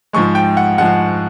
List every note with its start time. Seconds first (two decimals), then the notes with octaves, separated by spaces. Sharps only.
0.13 G#2 F3 G#3 C#6
0.35 G5
0.57 F#5
0.78 G#2 F3 G#3 F#5